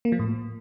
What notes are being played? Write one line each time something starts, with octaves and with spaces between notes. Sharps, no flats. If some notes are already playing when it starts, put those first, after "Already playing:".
A#3
F3
A2